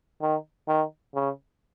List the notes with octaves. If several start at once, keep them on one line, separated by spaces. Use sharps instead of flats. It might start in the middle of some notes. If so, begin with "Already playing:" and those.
D#3
D#3
C#3